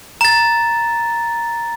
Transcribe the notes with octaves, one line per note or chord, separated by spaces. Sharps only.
A#5 A6